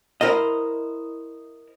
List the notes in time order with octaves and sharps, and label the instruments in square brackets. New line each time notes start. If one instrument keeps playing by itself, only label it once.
[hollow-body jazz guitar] E4 A#4 C5 D#5